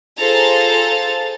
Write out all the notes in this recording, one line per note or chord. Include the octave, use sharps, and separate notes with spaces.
F4 G#4 A4 C5 A#5 A6